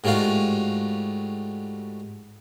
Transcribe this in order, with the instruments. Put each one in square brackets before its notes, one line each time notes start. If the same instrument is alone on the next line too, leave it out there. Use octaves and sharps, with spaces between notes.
[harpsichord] G#2 G3 A3 F4 F#4 F5